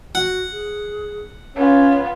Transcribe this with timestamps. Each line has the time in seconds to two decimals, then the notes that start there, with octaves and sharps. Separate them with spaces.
0.15 F#4 F#5
0.52 G#4
1.55 B3 C#4 F4 C#5